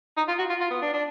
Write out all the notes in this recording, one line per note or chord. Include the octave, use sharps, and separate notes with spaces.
D#4
F4
F#4
F4
F4
B3
D4
D4